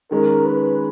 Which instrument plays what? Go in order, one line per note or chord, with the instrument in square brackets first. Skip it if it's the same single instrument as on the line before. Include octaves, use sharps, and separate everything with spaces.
[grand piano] D#3 G#3 C#4 [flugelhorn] A#4
[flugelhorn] B4